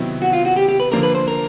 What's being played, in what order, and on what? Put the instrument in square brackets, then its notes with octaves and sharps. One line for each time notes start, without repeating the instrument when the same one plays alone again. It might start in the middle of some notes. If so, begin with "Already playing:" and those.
Already playing: [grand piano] C3 D#3 F#3 B3 E4
[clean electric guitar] F#4
F4
F#4
G4
G4
B4
[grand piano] D3 F3 A#3 D4 [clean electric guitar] A#4
[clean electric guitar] B4
C5
A#4